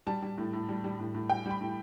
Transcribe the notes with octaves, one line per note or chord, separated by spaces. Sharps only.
G3 A5
G3
A2
A2
G3
G3
A2
A2
G3 G5
G3
B5
A2